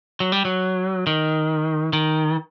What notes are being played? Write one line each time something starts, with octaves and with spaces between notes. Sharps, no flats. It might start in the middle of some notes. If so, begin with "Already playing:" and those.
F#3
G3
F#3
D#3
D#3